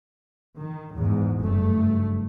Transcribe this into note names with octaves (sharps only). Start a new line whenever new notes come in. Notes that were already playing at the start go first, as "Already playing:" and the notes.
D#3
E2 G#2
F#1 G2 A3